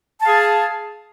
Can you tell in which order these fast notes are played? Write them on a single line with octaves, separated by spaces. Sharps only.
A5 F5 G#4